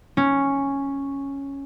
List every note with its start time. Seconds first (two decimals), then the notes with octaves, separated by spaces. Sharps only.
0.17 C#4